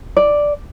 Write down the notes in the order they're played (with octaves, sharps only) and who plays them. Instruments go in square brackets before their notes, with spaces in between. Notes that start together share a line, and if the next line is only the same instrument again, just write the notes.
[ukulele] D5